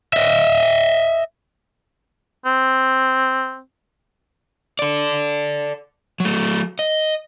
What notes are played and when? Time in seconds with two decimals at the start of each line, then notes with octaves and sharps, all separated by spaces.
0.13 D#5 E5
2.46 C4
4.79 A4 D5
6.20 F#3 A3
6.79 D#5